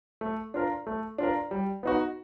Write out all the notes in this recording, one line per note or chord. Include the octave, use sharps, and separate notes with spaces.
A3
D4 F4 A#4
A3
D4 F4 A#4
G3
B3 D#4 F#4